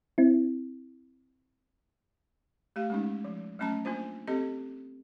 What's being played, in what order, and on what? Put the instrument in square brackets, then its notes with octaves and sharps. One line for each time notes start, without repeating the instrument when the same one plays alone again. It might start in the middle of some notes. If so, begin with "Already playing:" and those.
[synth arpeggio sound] C4 E4
[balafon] A3 G4 F5
G#3 C#4 D#4
F3
F#3 A3 C#4 A5 A#5
A#3 D4 F4 C5
C4 G4 A4 D#5